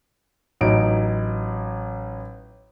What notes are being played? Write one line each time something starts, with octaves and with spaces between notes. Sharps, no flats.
A1 F#3 D#4 D7